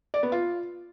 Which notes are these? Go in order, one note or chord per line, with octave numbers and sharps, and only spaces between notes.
D5
B3
F4